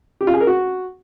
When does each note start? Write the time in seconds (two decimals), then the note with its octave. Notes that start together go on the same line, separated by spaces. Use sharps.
0.21 G4
0.27 F4
0.34 G#4
0.40 A#4
0.47 F#4